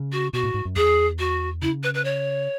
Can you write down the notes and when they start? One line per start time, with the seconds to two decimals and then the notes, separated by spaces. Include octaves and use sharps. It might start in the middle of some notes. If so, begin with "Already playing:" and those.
Already playing: C#3
0.12 F#4
0.33 B2 F#4
0.43 A2
0.54 G#2
0.65 F#2
0.76 E2 G#4
1.19 F#4
1.62 C#3 E4
1.83 B4
1.94 B4
2.04 C#5